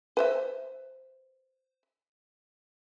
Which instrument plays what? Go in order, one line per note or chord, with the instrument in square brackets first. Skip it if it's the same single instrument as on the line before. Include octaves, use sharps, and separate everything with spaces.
[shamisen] B4 C5 E5